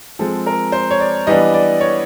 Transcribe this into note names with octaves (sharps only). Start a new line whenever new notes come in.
F3 G#3 C4 A4
A#4
C5
C#5
D5
E3 G3 B3 D4 D#5
D5
C#5